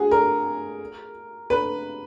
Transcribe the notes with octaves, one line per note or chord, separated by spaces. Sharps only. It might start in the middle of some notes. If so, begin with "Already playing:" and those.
Already playing: F#4 G#4
A#4
B4